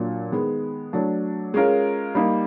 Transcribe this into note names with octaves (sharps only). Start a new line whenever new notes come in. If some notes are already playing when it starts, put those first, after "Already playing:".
Already playing: A#2 F#3 A#3 D4
D#3 G#3 B3
F#3 A3 D4
G#3 C#4 F4 A#4
G3 A#3 D#4